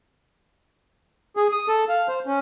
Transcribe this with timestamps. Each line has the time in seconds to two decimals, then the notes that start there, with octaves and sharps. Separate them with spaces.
1.37 G#4
1.52 D#6
1.68 A4
1.89 F5
2.08 C5
2.27 C#4